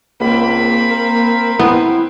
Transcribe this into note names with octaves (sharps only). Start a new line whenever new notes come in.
C#2 A#3 C4 B5
A#4
B3 C4 E4